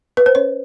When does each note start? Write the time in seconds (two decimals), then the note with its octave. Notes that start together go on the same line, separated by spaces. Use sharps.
0.17 B4
0.26 C5
0.35 C#4 C#5